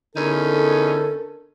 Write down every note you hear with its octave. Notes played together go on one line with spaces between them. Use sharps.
E2 D3 C#4 D#4 A4 A#4